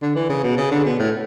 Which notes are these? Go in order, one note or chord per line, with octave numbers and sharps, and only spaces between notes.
D3
E3
C#3
B2
C#3
D3
B2
A2